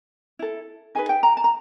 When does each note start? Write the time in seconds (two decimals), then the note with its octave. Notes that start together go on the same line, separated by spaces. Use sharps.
0.39 E4 A4
0.95 D#4 G#4 B4 G#5
1.09 G5
1.23 A#5
1.37 A5
1.44 A#5